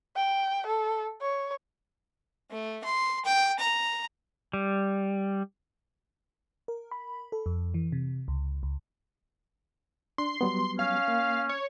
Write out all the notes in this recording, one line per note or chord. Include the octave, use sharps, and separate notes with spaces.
G5
A4
C#5
A3
C6
G5
A#5
G3
A#4
B5
A4
F2
E3
C3
C#2
C#2
D4 C6
F#3 G3 B3
C#4 F5
A#3
C#5